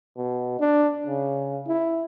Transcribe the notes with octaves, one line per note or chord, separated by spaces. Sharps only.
B2
D4
C#3
E4